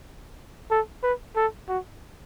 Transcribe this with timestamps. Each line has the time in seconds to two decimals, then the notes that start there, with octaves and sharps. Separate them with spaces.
0.71 A4
1.03 B4
1.36 A4
1.68 F#4